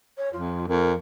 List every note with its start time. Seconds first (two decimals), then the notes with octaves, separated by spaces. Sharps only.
0.18 C#5
0.33 F2 F4
0.68 F2 A#4